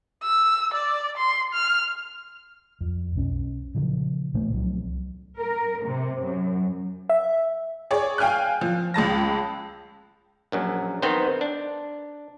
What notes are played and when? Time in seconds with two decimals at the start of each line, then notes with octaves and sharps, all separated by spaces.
0.24 E6
0.74 D5
1.17 C6
1.54 F6
2.81 F2
3.15 B1 C#4
3.75 A#2 C#3 E3 F3
4.34 A#2 E3 A3 B3
4.53 C2 C3 F3 F#3
5.37 A#4
5.84 C3
6.22 F#2
7.09 E5
7.91 G#4 C#5 D5
8.18 F5 G5 G#5 F6 F#6
8.61 F3
8.94 C#2 G#3 A5 A#6
10.52 A#1 F#2 F#3
11.02 D#3 B3 C4 D#4 C5
11.41 D4